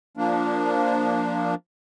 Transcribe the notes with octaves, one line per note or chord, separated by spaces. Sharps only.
F3 A#3 D4